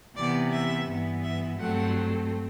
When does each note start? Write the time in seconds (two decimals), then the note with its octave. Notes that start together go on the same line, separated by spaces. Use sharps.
0.16 C3 E3 B3 D5
0.52 E5
0.87 G2 E3 B3
1.23 E5
1.59 G2 F#3 A3 C4 F#5